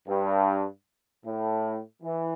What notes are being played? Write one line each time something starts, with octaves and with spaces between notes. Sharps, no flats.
G2
A2
E3